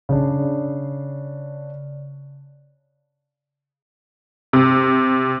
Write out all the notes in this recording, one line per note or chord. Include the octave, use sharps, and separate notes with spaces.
C#3 D4
C3